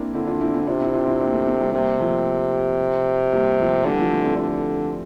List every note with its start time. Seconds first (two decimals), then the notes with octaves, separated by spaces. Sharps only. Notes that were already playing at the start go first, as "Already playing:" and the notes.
Already playing: A#3 C4 D4 E4
0.14 D3 C4 E4
0.27 D4 F4
0.41 C4 E4
0.53 C4 E4
0.67 C3 D4 F4
0.80 C4 E4
0.94 D4 F4
1.07 C4 E4
1.20 A#3 D4
1.34 A3 C4
1.46 A3 C4
1.60 G3 A#3
1.73 C3 G3 A#3
1.99 F3 A3
3.32 G3 A#3
3.59 F3 A3
3.85 D3 E3 G3
3.99 F3 A3
4.12 A3 C4
4.25 A3 C4
4.38 D3